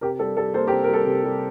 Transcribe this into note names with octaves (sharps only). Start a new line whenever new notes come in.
C3 G4 A#4
G3 A4
G3 A4
A#3 A4 C5
G4 A#4
C3
A#4
G3 A4
C3
G3